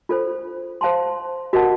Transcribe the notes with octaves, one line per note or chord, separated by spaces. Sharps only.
F4 A4 C5
C5 F5 A5 C6
F#4 A#4 D#5 F#5 A5